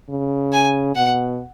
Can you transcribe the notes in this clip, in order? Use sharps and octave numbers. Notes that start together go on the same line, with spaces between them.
C#3
G#5
B2 F#5